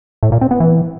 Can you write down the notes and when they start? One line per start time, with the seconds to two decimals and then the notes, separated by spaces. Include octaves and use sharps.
0.23 A2
0.32 A#2
0.41 C4
0.51 B3
0.60 E3